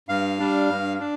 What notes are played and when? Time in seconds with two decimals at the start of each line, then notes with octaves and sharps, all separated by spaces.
0.09 G2 F5
0.39 G3 D4
0.69 G2
1.00 D4